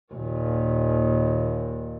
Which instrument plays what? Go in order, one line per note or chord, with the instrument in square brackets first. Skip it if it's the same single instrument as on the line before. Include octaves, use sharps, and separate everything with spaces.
[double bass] D#2 A#2